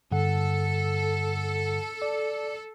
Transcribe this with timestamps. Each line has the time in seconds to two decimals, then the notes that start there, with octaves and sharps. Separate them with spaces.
0.12 G2 D3 A4 F#5
2.02 D5